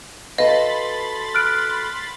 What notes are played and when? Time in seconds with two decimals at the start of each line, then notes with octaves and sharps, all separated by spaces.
0.38 F#4 A4 B4 D#5 F5 B5 C6 A6
1.35 F6 F#6 D7